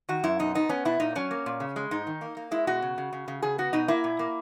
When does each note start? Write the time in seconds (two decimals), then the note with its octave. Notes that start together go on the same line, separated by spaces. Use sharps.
0.09 D#3 F#4
0.24 F#2 E4
0.39 B2 D#4
0.55 B3 D#4
0.69 B3 C#4
0.85 B2 E4
1.00 A#2 D#4
1.15 F#3 C#4
1.31 A#3
1.46 A#2
1.60 C#3
1.76 G#3
1.91 G#2 D#4
2.07 D#3
2.21 A#3
2.37 A#3
2.51 G#3 E4
2.67 B2 F#4
2.82 C#3
2.98 C#3
3.13 C#3
3.28 C#3
3.42 C#3 G#4
3.58 B3 F#4
3.73 B2 D#4
3.88 A#3 E4
4.04 A#2
4.19 A#3